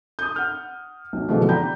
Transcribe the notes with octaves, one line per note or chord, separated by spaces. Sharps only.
D#6 G6
F#5 F6
B1
B2 D3 E3 F3 G#3 A3
D5 F#5 G5 A#5 B5 G6